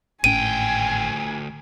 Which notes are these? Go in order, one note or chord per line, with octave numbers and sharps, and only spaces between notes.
G#1 D2 A2 C#4 G5 G#5 D#7